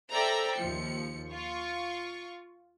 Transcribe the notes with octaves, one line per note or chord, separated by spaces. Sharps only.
A4 C5 D5 E5 G5 A#5
D#2 F3 C#7
F4 C#6